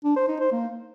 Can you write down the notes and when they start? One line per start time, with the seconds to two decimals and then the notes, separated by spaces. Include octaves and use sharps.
0.04 D4
0.16 C5
0.28 D#4
0.40 C5
0.52 A#3